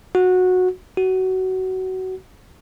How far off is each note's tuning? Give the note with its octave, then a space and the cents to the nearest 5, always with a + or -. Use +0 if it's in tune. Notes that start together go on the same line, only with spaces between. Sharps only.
F#4 -15
F#4 +20